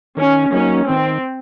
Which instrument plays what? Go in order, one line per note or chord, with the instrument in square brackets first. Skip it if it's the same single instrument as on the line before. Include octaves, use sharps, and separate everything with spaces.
[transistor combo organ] D#3 [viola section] C#4
[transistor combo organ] F#3 A#3 D#4 [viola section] C#4
[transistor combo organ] D#3 [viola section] C4